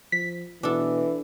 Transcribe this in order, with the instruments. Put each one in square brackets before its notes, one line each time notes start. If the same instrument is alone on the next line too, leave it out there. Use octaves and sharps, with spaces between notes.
[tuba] F3 [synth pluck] B6
[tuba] B2 [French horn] E3 [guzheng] D4 A4